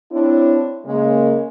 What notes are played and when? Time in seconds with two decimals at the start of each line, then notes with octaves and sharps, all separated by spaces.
0.11 C4 D4 E4 C#5
0.86 C#3 G#3 A#3